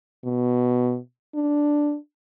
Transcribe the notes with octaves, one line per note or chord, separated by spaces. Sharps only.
B2
D4